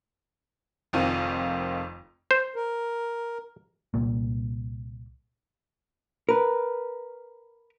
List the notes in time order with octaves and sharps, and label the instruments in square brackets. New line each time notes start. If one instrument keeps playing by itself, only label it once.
[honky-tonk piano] F1 F2 D#3 C4 F4 D#7
[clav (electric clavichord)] C5
[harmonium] A#4
[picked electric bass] C2 A#2 A#3
[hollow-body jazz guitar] A#4 B4